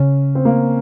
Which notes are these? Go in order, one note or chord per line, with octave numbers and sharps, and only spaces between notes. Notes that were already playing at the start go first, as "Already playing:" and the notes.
Already playing: C#3 C#4
C4
A#3